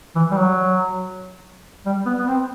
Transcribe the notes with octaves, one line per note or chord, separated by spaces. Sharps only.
E3
G3
F#3
G3
B3
B3
C4